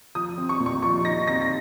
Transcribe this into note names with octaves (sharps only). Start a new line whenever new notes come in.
F3 D#6
C4
C#6
A#2
C#6
F3 C#6
D#4 A#6
C4 A#6
A#6